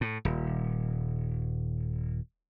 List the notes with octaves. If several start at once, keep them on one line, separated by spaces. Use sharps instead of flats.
A2
D#1